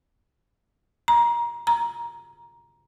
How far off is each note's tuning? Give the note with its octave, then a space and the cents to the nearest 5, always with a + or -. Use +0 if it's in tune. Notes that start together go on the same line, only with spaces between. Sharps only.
A#5 +25
A#5 +10